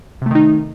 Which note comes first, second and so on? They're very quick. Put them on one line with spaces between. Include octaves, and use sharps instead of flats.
C3 A3 D#3 D#4